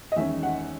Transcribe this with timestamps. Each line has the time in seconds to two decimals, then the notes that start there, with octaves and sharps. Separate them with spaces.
0.12 D#5
0.16 E2 D#3 G#3 C#4 E5
0.43 F#5